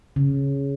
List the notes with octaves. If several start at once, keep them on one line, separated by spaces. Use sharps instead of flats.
C#3